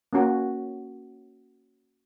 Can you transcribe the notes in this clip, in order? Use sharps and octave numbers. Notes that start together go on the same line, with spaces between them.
A#3 C#4 F#4